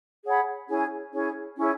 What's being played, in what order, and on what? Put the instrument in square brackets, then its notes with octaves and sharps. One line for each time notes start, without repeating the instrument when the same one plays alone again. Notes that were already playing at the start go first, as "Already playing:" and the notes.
[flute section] G#4 C#5 F#5 B5
C#4 E4 G#4 C#5
C#4 E4 G#4 C#5
C#4 E4 G#4 C#5